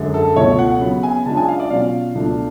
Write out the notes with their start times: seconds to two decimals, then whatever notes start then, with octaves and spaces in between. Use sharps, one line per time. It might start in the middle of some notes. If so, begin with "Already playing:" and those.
Already playing: F#2 D3 G#3
0.14 A4
0.36 C#2 B2 A3 F4 C#5
0.59 F#5
0.81 C#3 F#3 B3
1.03 G#5
1.26 C#3 G#3 D4 F4 A5
1.37 G#5
1.48 F5
1.60 D5
1.70 B2 F#3 C#4 F4 F5
2.15 C#2 B2 A3 D4 F4